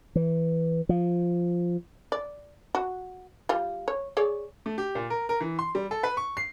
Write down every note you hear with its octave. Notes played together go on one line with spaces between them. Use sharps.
E3
F3
D5
F#4
G3 F4
C#5
G#4 C#5 D5
A3
G4
A#2
A#4
A#4
E3
C6
G3
A4
B4
C#6
C7